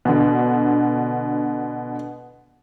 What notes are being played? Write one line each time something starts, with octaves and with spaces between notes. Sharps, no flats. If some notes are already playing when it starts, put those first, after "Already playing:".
B2 D3